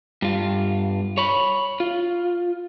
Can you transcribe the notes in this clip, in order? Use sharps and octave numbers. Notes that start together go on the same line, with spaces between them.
G2 F4
C#5 B5
F4